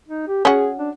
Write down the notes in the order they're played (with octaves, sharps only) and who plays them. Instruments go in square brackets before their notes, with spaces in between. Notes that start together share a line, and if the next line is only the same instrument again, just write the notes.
[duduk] D#4
G4
[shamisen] C#4 F#4 [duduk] G#4
[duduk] D4